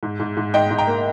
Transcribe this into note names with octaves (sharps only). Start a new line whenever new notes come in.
G#2
G#2
G#2
G#2 D#5 G5
G#2
G5 A#5
A#3